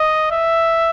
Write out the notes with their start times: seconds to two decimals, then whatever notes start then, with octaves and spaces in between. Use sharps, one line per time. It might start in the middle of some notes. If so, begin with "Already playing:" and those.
Already playing: D#5
0.31 E5